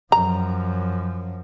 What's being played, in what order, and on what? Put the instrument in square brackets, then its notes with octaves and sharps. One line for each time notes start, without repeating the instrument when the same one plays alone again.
[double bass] F#2 F3 [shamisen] A#5